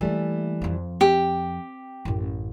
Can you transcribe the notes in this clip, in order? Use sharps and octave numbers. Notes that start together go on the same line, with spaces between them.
E3 G3 A3 A#3 A4
F2 F3
C4 G4
A1 F#2